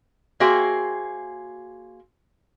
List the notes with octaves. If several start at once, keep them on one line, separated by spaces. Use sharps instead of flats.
A#3 F#4 G#4 C5 E5 G5